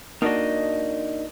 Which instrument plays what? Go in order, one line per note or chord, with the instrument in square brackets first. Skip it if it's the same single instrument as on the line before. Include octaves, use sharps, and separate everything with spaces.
[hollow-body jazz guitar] A#3 D4 F#4 [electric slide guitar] D#4 D#5